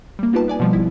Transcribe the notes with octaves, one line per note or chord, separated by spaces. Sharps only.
G3 A#3
B3 D#4 F4 G4 B4 A5
B3 D5 G#5
B2 F3 G3
G#1 F3 E4